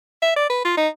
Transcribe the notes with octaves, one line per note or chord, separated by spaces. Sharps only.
E5
D5
B4
F4
D#4